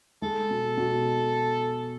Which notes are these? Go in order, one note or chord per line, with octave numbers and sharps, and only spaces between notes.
G#3 A4
B2
B2